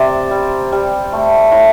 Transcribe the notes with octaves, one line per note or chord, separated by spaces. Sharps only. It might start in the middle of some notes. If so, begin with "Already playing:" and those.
Already playing: C3 C5 D5
G3
G3
A3
A2